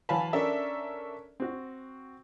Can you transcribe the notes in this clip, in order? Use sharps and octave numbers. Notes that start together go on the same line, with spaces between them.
E3 F#3 F5 G#5 A5 B5
C#4 D4 A4 A#4 E5
C4 F#4